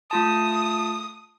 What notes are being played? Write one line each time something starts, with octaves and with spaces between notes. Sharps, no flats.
A3 F4 A5 D#6